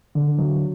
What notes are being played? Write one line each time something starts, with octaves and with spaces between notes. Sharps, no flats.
D3
F#3